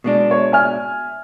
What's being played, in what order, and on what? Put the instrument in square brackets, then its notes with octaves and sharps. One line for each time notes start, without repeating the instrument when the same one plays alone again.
[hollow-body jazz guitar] B2 G#3 D4
[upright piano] C#5
E5 G#5 F6